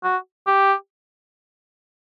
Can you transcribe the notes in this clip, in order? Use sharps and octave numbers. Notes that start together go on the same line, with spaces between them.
F#4
G4